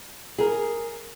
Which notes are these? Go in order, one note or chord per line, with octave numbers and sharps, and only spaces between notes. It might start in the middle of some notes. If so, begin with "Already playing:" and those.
G#4 A#4